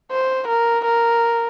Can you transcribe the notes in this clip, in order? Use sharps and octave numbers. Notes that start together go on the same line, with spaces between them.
C5
A#4
A#4